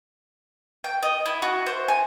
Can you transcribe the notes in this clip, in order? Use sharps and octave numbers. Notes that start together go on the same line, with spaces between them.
G5
D#5
E4
F#4
C5
G#5